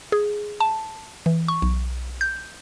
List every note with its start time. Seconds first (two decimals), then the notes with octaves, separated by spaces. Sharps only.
0.12 G#4
0.60 A5
1.26 E3
1.48 C#6
1.62 B1
2.21 G6